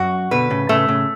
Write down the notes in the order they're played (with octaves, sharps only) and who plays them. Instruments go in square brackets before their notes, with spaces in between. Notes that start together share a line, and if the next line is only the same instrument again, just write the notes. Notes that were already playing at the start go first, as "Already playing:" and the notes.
Already playing: [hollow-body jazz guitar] F#2 [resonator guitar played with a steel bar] F#4
[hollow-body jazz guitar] B2 D3 [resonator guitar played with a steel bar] B4
[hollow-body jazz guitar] A2 C#3
[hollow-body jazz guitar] A2 C#3 [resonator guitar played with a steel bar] A3
[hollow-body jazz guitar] A2 C#3